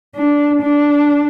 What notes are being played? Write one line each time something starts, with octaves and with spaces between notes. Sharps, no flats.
D4
D4